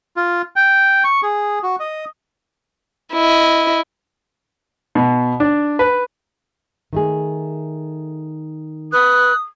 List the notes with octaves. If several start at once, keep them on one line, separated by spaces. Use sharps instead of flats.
F4
G5
C#6
G#4
F#4
D#5
E4 D#5
B2
D4
B4
D#3 A3 G#4
B4 D#6 F#6